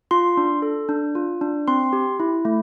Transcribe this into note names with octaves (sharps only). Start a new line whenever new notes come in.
F4 C6
D4
A4
D4
F4
D4
C4 C6
G4
E4
A3